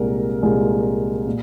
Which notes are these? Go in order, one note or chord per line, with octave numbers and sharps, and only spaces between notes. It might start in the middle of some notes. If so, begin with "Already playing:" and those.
Already playing: C2 A#2 G#3 A#4
C2 A#2 G#3
A#2